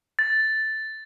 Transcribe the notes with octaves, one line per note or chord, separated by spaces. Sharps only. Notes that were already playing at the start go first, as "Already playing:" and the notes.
A6